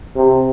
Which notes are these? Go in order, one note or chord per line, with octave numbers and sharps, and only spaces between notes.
C3